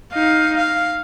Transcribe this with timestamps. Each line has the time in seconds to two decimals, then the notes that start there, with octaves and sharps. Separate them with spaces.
0.13 D#4 F5
0.57 F5